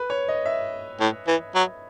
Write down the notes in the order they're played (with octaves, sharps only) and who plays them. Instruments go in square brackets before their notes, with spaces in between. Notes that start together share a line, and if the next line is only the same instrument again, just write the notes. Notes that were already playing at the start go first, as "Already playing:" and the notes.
Already playing: [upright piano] B4
C#5
D#5
E5
[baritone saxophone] A2
E3
F#3